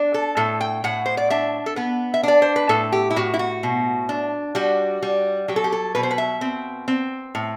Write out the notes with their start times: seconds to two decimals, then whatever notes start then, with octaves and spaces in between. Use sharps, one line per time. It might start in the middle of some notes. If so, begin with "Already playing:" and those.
Already playing: D4
0.14 A4
0.37 A2 A4
0.61 G5
0.84 A2 F#5
1.06 C5
1.17 D5
1.30 D4 E5
1.66 A4
1.76 B3 B4
2.14 E5
2.23 D4 D5
2.42 C5
2.56 B4
2.69 A2 A4
2.92 G4
3.11 E4
3.16 A2 F#4
3.34 E4
3.39 F#4
3.63 B2
4.09 D4
4.55 G3 F#4
5.02 G3
5.48 F#3 G4
5.56 A4
5.64 G4
5.72 A4
5.95 B2 B4
6.03 C5
6.11 B4
6.18 E5
6.41 C4
6.88 C4
7.35 A2